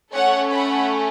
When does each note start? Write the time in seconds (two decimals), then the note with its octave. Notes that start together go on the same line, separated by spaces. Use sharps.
0.12 A3 C#4 A4 C#5 F#5
0.52 F#5 B5